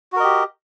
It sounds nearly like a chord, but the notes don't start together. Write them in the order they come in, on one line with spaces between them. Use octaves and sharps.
F#4 A#4 D#5 G4